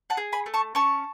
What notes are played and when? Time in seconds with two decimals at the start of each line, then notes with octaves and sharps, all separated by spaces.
0.10 F#5 A5
0.17 G#4
0.32 G#5 B5
0.46 A3
0.54 A5 C#6
0.75 C#4 A5 C#6